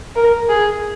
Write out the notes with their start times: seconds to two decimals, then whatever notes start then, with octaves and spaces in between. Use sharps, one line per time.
0.16 A#4
0.49 G#4